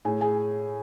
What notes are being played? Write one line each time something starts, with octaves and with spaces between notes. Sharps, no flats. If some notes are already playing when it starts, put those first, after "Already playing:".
A2 G#4 G#5
G#4 G#5